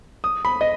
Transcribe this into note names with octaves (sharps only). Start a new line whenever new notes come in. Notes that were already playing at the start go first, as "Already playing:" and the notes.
D#6
B5
D#5